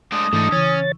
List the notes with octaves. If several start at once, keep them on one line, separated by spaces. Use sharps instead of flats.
G#3 A3 D4 D#6
G#2 D3 E3 A3 D#4 A4
C#3 E3 C#4 C#5 A6